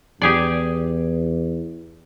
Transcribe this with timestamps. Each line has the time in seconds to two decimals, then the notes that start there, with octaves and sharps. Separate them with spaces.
0.22 E2 G4 G#4 D5